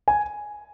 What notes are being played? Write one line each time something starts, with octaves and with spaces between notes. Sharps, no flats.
G#5